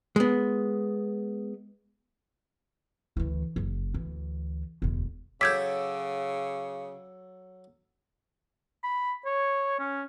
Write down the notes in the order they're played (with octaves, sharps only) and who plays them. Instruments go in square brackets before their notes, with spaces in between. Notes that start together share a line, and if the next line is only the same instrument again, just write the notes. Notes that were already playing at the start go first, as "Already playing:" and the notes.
[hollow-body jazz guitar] G#3 B3
[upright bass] D2 E3
F#1
D2 E3
E1 D2
[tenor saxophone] C#3 [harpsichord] F#3 A4 [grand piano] D6 E6 [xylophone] G6 G#6 B6
[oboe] B5
C#5
C#4